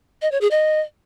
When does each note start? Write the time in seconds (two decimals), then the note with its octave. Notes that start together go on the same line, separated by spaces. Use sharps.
0.22 D#5
0.31 C#5
0.41 G#4
0.51 D#5